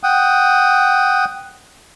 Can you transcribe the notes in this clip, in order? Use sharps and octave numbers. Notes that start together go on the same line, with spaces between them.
F#5 G5 D#6